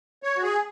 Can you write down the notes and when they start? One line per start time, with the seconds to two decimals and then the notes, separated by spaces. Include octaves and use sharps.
0.23 C#5
0.37 F#4
0.43 G#4